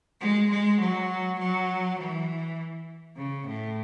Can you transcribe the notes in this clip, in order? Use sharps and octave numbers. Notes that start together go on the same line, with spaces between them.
G#3
G#3
F#3
F#3
E3
C#3
A2